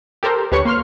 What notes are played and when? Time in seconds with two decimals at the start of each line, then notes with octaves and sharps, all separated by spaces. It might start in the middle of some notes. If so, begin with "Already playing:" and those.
0.23 G4 A4 A#4 C5
0.52 D2 G4 B4 C#5 C#6 C#7
0.65 A#3 C6 F6